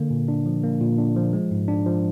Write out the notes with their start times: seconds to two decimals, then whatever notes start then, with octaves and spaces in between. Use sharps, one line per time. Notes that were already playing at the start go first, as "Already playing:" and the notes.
Already playing: D3 A#3
0.10 A#2
0.28 D4
0.46 F3
0.63 A#3
0.81 A#2
0.98 D4
1.16 F3
1.33 G#3
1.51 G#2
1.68 D4
1.86 F3